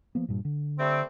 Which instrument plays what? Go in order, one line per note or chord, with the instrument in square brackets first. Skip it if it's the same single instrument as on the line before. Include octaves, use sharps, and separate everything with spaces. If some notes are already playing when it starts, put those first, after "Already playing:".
[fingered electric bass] F3 A#3 B3
G2 A#2
D3
[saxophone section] G3 A3 C4